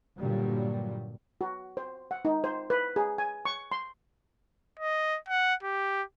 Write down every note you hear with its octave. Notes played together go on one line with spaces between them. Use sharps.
G2 A#2 D3 F#3 G3
F#4
C5
F#5
D#4
C5
B4
G#4
G#5
C#6
C6
D#5
F#5
G4